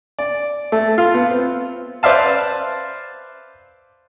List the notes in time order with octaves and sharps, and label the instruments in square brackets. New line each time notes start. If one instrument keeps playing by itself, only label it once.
[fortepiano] D5
A3
F4
B3
C4
B4 C5 D5 E5 F5 A5